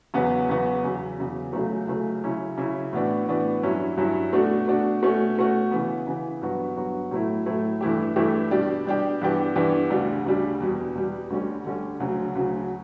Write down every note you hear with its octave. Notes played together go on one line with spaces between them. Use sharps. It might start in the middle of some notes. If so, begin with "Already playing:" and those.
E2 C#3 F#3 B3 F#4
E2 C#3 F#3 B3 F#4
E2 C#3 F#3
E2 C#3 F#3
C#2 C#3 F#3 A3
C#2 C#3 F#3 A3
C#3 F#3 C#4 E4
C#3 F#3 C#4 E4
A2 E3 B3 D4 F#4
A2 E3 B3 D4 F#4
G2 F#3 C#4 E4
G2 F#3 C#4 E4
B2 A3 D4 F#4
B2 A3 D4 F#4
B2 A3 C#4 F#4
B2 A3 C#4 F#4
C#3 E3 B3
C#3 E3 B3
G2 F#3 B3 F#4
G2 F#3 B3 F#4
A2 F#3 A3 E4
A2 F#3 A3 E4
G2 E3 A3 E4 G4
G2 E3 A3 E4 G4
B2 G3 D4 G4
B2 G3 D4 G4
G2 E3 B3 D4 G4
G2 E3 B3 D4 G4
D2 C#3 G3 D4
D2 C#3 G3 D4
E2 B2 G3
E2 B2 G3
D2 D3 G3 C#4
D2 D3 G3 C#4
D2 C#3 F#3
D2 C#3 F#3